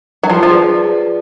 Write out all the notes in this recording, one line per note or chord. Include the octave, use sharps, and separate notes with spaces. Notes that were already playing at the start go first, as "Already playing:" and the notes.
F#3
F3 F4
F3
G#4 B4 D5